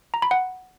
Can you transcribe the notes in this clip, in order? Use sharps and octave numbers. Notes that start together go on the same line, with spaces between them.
A#5
B5
F#5